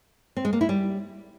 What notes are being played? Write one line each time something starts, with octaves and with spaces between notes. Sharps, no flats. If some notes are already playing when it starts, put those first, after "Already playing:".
C4
G#3
A#3
E4
G3